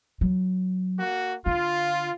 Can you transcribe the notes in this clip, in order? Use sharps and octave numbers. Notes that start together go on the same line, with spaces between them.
F#3
A#3 F#4
D3 F4